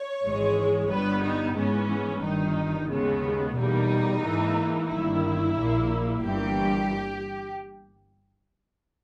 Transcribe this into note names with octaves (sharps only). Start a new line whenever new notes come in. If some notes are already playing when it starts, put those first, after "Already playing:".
Already playing: C#5
G#1 G#2 E3 G#3
G1 G2 G3 B3 B4
D#4
G#2 E3 G#3 B3 C#4
G1 G2 D#3 D#4
D#2 C#3 G#3 B3
E2 B2 G3 A#3 D#4
G#2 E3 A#3
G1 G2 D#3 A#3 E4
A#1 A#2 A#3
G1 G2 E3 A#3 G4